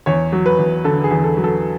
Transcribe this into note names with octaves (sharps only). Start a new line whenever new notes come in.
E2 C#5
F#3
B4
E2
D3 A4
G#4
E2
A4
F#3
A4